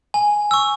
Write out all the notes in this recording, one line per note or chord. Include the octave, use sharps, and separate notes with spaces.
G#5
C#6 E6